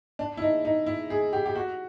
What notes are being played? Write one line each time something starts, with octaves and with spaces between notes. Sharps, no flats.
D4
E4
D#4
D#4
E4
G#4
G4
G4
F#4